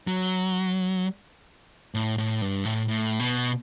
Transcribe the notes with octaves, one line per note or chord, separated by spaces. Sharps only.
F#3
A2
A2
G2
A2
A2
B2